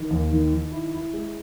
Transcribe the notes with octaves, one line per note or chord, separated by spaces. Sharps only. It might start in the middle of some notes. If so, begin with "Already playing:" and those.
Already playing: D#3
D#2
D#3
D#3
E4
E4
G#3